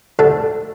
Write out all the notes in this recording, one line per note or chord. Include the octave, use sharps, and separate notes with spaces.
D2 D3 A3 A4